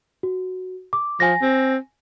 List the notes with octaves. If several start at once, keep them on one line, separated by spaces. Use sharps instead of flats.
F#4
D6
F3 G#5 A#6
C4